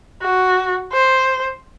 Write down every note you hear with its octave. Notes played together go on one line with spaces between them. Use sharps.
F#4
C5